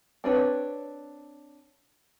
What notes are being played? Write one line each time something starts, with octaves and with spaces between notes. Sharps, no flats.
C4 D4 B4 C#5